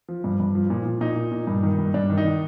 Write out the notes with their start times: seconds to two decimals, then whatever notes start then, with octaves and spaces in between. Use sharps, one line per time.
0.08 F3
0.24 G2
0.40 G2
0.55 F3
0.70 A#2
0.85 A#2
1.01 A#2 D#4
1.16 A#2
1.32 A#2
1.47 G2
1.63 D#3
1.78 G2
1.94 G2 D4
2.10 D#3
2.18 D#4
2.25 D#3